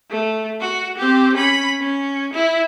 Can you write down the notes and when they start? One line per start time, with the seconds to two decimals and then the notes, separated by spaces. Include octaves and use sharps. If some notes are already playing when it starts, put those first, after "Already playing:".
0.10 A3
0.60 F#4
0.98 C4 G4
1.34 C#4 B5
1.80 C#4
2.33 E4